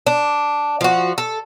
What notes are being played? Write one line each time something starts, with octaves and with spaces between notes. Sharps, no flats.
D4
F3 F#4
A4